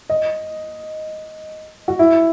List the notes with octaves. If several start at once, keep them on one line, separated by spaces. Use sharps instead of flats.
D#5
F#4
E4